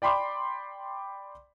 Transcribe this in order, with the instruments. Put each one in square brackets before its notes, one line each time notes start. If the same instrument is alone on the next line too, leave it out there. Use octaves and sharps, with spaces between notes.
[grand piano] D5 G5 B5 C6 D6